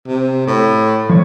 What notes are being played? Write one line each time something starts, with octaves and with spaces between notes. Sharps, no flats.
C3
A2
F3 C#5